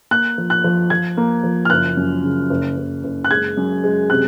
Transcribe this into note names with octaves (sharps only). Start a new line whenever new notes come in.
A#3 F#6
F3
F#6
F3
F3 G#6
A#3
F3
F6
F#1 F#6
F#2
C#3
F#1
F#1
F#1
F#6
G#3 G#6
F#2
G#3
C3 F#6